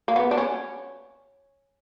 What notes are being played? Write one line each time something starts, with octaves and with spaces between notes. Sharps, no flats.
A#3
B3
D4
C#4